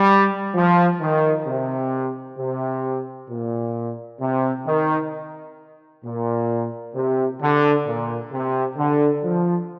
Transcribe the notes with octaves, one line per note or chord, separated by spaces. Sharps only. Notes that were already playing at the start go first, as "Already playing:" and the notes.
Already playing: G3
F3
D#3
C3
C3
A#2
C3
D#3
A#2
C3
D3
A#2
C3
D3
F3